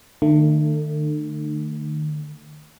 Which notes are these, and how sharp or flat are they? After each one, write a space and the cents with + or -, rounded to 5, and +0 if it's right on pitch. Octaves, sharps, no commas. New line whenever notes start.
D#3 -45 A3 +25